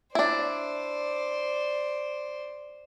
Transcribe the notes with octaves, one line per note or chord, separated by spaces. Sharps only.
D4 E4 C5 D5